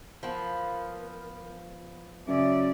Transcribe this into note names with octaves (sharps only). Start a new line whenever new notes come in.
F3 B3 A#4
F#2 C#3 D5 E5